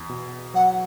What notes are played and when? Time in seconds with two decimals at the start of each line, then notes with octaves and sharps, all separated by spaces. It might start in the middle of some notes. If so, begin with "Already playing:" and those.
Already playing: E2
0.09 B2
0.54 F#3 F#5